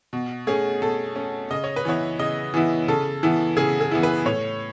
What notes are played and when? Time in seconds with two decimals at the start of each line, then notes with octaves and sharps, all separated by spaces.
0.13 B2
0.47 A3 C#4 G#4
0.82 B2 A4
1.16 A3 C#4
1.50 C#3 D#5
1.64 C#5
1.76 B4
1.85 E3 B3 E4 C#5
2.19 C#3 D#5
2.54 E3 B3 E4
2.88 C#3 A4
3.23 E3 B3 E4
3.57 C#3 G#4
3.81 G#4
3.91 E3 B3 E4
4.03 B4
4.26 A2 C#5